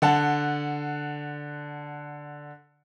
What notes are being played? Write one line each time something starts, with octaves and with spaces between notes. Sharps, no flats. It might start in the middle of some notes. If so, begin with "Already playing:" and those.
D3 F#5 A5